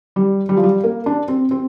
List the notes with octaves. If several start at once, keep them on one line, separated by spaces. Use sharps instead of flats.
G3
G3
F3
G3
A#3
D4
C4
C4